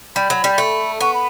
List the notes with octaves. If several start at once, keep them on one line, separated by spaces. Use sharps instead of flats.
G3 B5
F#3
G3
A3
B3 C#6
B5